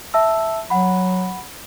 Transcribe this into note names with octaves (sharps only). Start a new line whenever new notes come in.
E5 A5 E6
F#3 F#5 B5